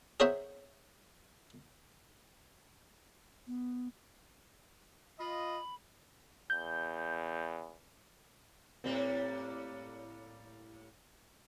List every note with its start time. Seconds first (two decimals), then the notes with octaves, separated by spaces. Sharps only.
0.20 G#4 A#4 C5 C#5 E5 F#5
3.47 B3
5.19 F4 D#5 B5
6.50 E2 G6
8.84 A2 G3 A#3 C4